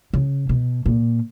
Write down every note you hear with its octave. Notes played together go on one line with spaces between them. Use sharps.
C#3
B2
A#2